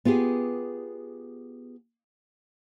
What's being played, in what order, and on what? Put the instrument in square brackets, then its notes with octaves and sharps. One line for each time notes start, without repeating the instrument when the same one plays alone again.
[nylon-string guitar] B3 F4 G4 G#4